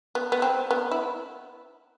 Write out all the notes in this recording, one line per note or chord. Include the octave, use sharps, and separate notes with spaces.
B3
B3
C4
B3
E4